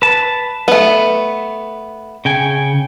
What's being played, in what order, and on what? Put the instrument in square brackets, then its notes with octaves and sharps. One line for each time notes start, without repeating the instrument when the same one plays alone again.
[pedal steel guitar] B4 A5
[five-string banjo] A3 B3
[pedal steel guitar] C#3 G5 G#5